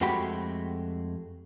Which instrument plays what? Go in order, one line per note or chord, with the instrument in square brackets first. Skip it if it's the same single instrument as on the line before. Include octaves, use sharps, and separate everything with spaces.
[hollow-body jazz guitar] F2 G#3 A3 F#4 G4 B5